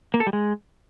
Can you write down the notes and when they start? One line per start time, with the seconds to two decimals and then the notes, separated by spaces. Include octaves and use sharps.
0.14 A#3
0.20 A4
0.27 G3
0.33 G#3